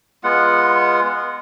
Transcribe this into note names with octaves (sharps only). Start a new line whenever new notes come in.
G#3 B3 F4 F#5